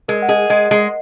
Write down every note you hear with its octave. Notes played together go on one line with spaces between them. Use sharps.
G#3 A#4
F#5
G#4 D#5
G#3 D#5
G#3